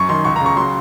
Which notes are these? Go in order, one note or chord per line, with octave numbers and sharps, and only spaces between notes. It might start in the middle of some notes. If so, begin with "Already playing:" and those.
Already playing: F#2 C#6
D#3 C6
C#2 C#6
A#5
C#3
C#6
F#3 C6